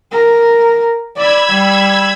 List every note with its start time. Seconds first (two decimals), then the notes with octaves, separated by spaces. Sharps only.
0.12 A#4
1.16 D5 B5 E6 G#6
1.49 G3